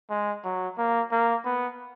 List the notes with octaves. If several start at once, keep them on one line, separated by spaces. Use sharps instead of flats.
G#3
F#3
A#3
A#3
B3